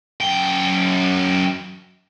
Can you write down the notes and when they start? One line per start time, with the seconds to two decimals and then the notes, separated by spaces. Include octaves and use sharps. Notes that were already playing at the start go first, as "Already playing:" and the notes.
0.21 F#2 G5